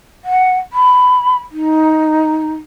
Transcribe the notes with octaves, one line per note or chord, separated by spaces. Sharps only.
F#5
B5
D#4